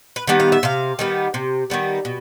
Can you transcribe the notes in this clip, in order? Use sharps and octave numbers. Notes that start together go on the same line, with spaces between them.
B4
D#3 G3 B3
F5
E5
C3 F5
D#3 G3 B3
C3
D#3 G3 B3
B2